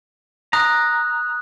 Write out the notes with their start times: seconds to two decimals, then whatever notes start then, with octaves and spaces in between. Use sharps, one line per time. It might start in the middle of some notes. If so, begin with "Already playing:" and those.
0.53 A#5 D#6 F#6